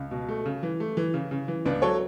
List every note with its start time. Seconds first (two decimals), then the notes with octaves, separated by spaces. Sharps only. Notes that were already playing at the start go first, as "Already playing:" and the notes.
Already playing: C#2
0.11 B2
0.29 A3
0.46 C#3
0.63 E3
0.80 A3
0.97 E3
1.14 C#3
1.31 C#3
1.48 E3
1.65 C#2 B3 D4
1.82 F#3 A4 C#5